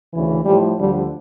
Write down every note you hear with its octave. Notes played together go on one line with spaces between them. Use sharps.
D2 C#3 E3
A2 F3 G3
D2 D3 F3 G3